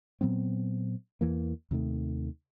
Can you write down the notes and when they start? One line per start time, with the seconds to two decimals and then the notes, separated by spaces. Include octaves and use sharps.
0.21 A#2 F#3 B3 C4
1.21 E2 E3 A#3
1.71 D#2 C3 D#3 A3